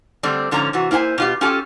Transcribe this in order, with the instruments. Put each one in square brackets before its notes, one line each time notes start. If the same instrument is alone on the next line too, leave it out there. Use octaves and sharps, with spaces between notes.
[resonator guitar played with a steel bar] D3 G3 A3 C4 D5
G#2 D3 F3 C#4 A#5
C3 E3 F#4
A#3 E4 C5 F#5 G#5
B2 F4 G4
C#4 F4 G4 A4 G#5